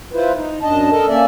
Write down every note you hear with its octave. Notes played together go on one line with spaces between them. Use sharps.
E4 F4 B4 C5
D#4
F#2 D4 D#5 A5
A4 A#4 D#5 A5
A#3 C#4 D5 E5